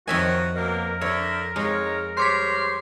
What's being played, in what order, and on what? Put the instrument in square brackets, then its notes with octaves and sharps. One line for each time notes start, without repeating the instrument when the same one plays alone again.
[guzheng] F2 E5 G#5 [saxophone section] D#3 C#5 [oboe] F#4
[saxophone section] F#2 B2 A#3 [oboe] A#4
[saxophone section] D3 E5 [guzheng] C#5
[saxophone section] F2 D#4 C#5 [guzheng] G#3
[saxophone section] G3 C5 C#5 [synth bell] C6 D6 B6